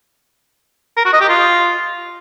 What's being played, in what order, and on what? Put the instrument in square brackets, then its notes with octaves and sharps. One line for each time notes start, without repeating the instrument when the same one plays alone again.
[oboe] A#4
F#4
D#5
G4
F4